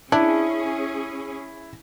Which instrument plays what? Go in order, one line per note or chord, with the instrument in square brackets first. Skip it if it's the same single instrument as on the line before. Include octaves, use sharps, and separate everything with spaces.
[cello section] C#4 G#4 [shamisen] D4 [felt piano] E4